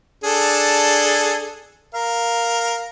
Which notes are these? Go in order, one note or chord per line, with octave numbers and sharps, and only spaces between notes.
D4 G#4 A4
A#4 F5